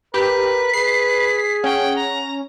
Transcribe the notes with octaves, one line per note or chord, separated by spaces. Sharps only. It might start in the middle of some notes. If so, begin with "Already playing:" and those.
G4 A#4 B4 B6
G#4 B4 C7
C#4 F#5 G5
A#5